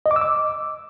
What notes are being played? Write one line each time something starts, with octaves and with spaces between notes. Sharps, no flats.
D#5
D6
E6
D6